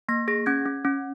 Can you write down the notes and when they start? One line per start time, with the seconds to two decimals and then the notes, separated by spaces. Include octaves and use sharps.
0.09 A#3 A#6
0.28 G#4 A#6
0.46 C#4 G#6
0.66 C#4
0.85 C#4